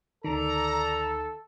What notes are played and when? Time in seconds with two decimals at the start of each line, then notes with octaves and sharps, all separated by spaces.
0.24 D2 D#3 A4 D5 A#5